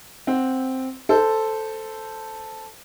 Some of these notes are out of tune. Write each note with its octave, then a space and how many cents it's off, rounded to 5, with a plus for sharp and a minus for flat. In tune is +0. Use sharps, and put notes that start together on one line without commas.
C4 +0 F#5 +0
A4 +0 C5 -10